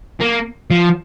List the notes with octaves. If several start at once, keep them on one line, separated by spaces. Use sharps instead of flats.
A#3
F3